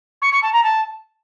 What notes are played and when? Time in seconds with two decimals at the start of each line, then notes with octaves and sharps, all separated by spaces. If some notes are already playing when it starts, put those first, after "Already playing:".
0.21 C#6
0.32 C#6
0.42 A5
0.53 A#5
0.63 A5